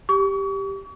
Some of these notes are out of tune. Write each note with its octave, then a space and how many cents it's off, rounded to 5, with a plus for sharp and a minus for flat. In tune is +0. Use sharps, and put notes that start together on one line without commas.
G4 +0 C#6 +40